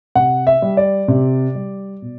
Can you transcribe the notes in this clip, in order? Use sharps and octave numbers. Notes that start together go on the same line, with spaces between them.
C3 F#5
E5
G3
D5
C3
G3
B2